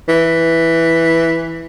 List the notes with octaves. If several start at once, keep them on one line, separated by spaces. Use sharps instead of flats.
E3